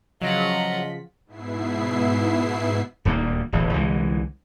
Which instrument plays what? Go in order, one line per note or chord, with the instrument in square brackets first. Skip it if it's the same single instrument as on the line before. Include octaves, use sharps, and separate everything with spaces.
[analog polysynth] C#3 F3 B6 [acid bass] F#3 [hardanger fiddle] F4 F#5 [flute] D#5
[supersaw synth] G#2 B2 B3 E4 E5 C7
[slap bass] D#1 D2 G3 A#3
D1 A1 B2 E3
C2 D3 E3 G#3